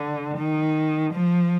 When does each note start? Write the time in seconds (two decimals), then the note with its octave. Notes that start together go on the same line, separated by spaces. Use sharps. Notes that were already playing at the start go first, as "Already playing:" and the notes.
Already playing: D3
0.38 D#3
1.13 F3